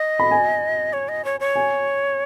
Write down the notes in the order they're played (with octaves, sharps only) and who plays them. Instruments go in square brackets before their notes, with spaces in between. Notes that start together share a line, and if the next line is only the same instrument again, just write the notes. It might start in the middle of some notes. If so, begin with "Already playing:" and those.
Already playing: [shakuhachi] D#5
[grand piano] B5
G#5
[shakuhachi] C#5
D#5
C#5
C#5
[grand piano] G#5